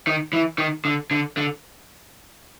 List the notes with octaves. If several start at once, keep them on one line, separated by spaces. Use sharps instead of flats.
D#3
E3
D#3
D3
D3
D3